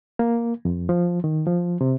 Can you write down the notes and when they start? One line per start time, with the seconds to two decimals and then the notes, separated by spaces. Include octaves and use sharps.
0.19 A#3
0.65 F2
0.89 F3
1.24 D#3
1.47 F3
1.81 C3